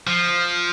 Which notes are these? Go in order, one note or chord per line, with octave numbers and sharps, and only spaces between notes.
F3